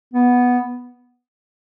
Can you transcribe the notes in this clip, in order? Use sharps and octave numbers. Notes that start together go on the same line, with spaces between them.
B3